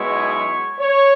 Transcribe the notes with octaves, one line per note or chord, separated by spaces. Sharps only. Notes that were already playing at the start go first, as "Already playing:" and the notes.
Already playing: B1 B2 G#3 B3 E4 C#5
C#5